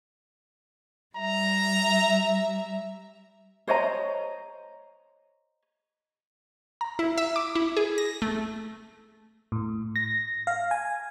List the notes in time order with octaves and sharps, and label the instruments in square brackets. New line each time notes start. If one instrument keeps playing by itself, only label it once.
[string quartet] G3 E5 [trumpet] A#5
[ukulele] C5 C#5 D#5 A#5
[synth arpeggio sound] A#5
E4
E5
D6
E4
G#4
A#6
A3
[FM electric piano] A2
A#6
F5
G#5